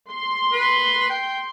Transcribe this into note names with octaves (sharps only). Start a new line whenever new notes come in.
C6
B4
G5